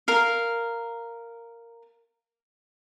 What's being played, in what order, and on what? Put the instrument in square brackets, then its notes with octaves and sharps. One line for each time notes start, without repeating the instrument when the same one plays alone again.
[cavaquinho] A#4 F5